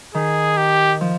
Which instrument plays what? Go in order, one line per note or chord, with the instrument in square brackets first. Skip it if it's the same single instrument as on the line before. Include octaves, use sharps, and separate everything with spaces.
[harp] D#3 [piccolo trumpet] G#4
[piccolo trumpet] G4
[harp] F3